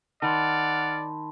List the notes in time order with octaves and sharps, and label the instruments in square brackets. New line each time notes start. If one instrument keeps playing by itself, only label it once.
[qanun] D#3 [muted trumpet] D5 [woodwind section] F#5 F6 [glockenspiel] A5 B5 C6